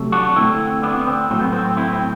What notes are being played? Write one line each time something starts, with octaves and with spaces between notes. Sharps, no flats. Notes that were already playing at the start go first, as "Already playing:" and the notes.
Already playing: C3 F#3 A3
D4 F#4
D3 A3 C4 E4
B3 D4
C4
A2 F#3 A3 C4
B3
C4
C4
C4 E4
C4